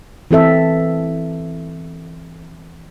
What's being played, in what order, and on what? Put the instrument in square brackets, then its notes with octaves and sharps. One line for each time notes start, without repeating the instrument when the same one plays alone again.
[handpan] E3 C4 A4 E5